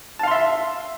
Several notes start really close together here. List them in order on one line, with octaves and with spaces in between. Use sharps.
A5 F5 C6 E5